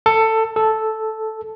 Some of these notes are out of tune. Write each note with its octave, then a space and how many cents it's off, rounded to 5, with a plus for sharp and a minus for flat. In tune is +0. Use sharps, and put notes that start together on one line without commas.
A4 +15
A4 -5